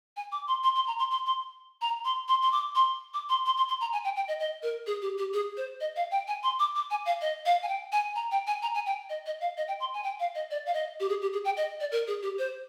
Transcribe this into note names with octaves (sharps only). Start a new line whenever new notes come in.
G#5
D6
C6
C6
C6
A#5
C6
C6
C6
A#5
C6
C6
C6
D6
C6
D6
C6
C6
C6
C6
A#5
G#5
G5
G5
D#5
D#5
A#4
G#4
G4
G4
G#4
C5
D#5
F5
G5
G#5
C6
D6
D6
G#5
F5
D#5
F5
G#5
G5
G#5
A#5
G5
G#5
A#5
G#5
G5
D#5
D#5
F5
D#5
G5
C6
G#5
G5
F5
D#5
D5
F5
D#5
G4
G#4
G4
G#4
G5
D#5
D5
A#4
G#4
G4
C5